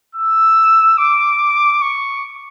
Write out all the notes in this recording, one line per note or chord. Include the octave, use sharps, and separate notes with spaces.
E6
D6
C#6